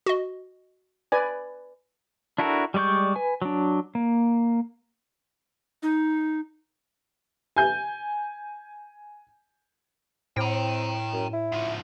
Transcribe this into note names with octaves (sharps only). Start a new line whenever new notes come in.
F#4 D#5
B4 D5 G#5
D4 E4 F#4 A4 A#4
G3 G#3 D5 C#6 G6
B4 G#5
F#3 D4
A#3
D#4
G#5 G6
A2 C4 G5 A#5
F#2
E4
G#2 F3